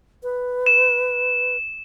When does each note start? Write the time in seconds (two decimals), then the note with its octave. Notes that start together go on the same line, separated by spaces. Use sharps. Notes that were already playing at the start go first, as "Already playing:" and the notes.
0.23 B4
0.66 E7